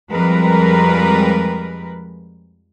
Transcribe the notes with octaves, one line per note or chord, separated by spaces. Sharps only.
F2 F3 G3 G#3 A#4 B4